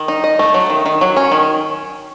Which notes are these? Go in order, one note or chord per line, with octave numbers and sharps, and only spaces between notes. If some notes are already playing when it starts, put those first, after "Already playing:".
Already playing: D#3
D#4
D#5
A3
F#3
D#3
D#3
F#3
C#4
D#3